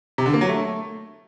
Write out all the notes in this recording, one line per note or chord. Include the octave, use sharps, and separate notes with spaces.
C3
D3
A#3
F#3
A3